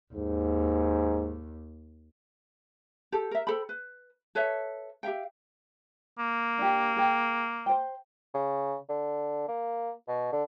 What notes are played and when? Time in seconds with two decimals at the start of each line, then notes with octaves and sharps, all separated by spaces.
0.14 D#2 G#2
3.12 G4 A4
3.31 A#4 E5
3.47 A4 C5 G5 B5
3.69 B4
4.35 A4 B4 C#5 E5
5.03 G4 E5 F5 G5
6.19 A#3
6.58 D4 G4
6.96 G#4 G5
7.66 C5 G5
8.34 C#3
8.89 D3
9.48 A#3
10.08 B2
10.32 D3